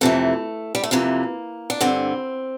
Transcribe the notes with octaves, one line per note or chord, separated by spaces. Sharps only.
F2 C3 E3 A3
G3
A3
F2 C3 E3 A#3
D4
G2 D3 C4